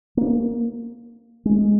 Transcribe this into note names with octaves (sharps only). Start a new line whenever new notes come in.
A#3
G#3